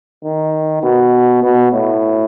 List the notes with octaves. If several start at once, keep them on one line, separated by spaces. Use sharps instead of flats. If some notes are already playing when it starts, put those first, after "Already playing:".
D#3
B2
B2
A2